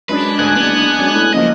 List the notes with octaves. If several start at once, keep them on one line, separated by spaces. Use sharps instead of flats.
F#2 G#3 D4 B4
D2 G#2 G#5 F#6
F#1 B3
F#2 B3
A2
F#1 F3 A#3 D#5